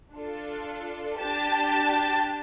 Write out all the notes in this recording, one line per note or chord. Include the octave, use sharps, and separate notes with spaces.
D4 F4 A4
D4 G4 A5